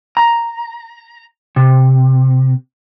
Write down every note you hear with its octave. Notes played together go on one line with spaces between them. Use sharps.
A#5
C3